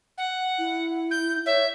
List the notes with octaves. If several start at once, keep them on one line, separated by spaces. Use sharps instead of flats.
F#5
E4
G6
C#5 E5